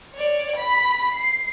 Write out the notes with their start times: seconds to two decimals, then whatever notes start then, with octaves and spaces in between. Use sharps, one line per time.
0.14 C#5 D5
0.56 B5 B6
1.14 C7